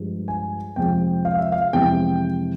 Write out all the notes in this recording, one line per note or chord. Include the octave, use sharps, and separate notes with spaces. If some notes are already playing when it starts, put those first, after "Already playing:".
Already playing: G2 F3 G#3
G#5
F2 C3 F3 G#3 G5
F5
E5
F5
F2 C3 E3 G#3 G5